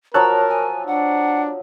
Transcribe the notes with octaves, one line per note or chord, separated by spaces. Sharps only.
F3 F#3 A#4 C#5 A5 A#5 E6 F#6
G#5
D4 F#5